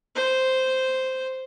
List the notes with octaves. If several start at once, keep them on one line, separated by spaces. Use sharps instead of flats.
C5